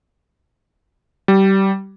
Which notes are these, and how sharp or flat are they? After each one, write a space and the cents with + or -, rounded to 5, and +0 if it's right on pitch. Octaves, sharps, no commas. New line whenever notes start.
G3 -20